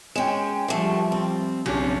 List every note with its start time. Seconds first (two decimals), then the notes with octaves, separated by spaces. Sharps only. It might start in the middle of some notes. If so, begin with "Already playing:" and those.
0.16 G#3 C#4 G5 E7
0.68 D3 F3 G3 A3
1.12 C4
1.66 F#1 B1 C3 C#4 D4